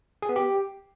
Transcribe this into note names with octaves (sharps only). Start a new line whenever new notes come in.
G#4
B3
G4